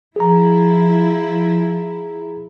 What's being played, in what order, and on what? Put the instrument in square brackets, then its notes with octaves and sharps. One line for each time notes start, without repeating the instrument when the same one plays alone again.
[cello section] F3 E4 [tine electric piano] G#4 A#5